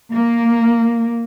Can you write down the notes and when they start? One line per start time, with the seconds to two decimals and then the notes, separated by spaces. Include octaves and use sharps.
0.12 A#3